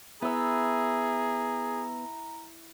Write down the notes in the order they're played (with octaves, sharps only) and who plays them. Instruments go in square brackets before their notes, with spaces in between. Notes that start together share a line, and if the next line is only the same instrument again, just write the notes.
[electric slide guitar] B3 [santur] E4 E6 [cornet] G#4 [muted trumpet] A#5